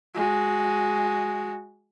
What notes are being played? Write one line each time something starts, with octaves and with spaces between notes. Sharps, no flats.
G#3 F#4